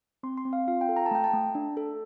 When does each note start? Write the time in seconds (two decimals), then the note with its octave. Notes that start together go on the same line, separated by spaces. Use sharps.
0.23 C4 C6
0.37 C6
0.45 C4
0.53 F5
0.68 F4 F5
0.81 G5
0.89 A4
0.96 A#5
1.06 A5
1.11 A3 G5
1.24 A5
1.33 A3
1.55 D4
1.77 A4